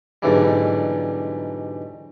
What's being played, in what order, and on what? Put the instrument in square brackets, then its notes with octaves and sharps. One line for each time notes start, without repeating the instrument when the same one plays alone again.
[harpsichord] G#2 B2 D3 E3 F#3 G3